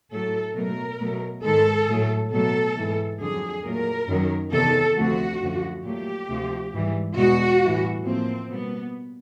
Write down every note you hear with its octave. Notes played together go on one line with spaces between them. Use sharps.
A2 F#3 A3 A4
B2 F#3 A3 A#4
B2 F#3 A3
G#2 D#3 G#3 A4
A2 F#3 A3
B2 F#3 A3 A4
G#2 E3 A3
F2 D3 F#3 G#4
A#2 F#3 A3 A#4
F#2 D#3 F#3
E2 C3 D#3 A4
D2 C3 F3 A3 F#4
F#2 D3 F3 A3
A#2 F#3 A3 G4
D2 C3 F3
G#2 E3 G3
E2 B2 G#3 F#4
A2 E3 G3
A2 F3 A#3 C4
B2 G3 A#3 B3